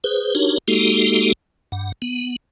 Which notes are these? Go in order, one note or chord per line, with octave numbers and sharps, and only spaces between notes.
G#4 B4 C5
D4 D#4 F#4 G4 A#4 C#5
G#3 A#3 D#4 F#4 G4 A4
G2 F#5
B3